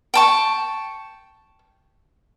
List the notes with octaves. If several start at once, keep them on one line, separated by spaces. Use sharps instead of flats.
G5 A5 C#6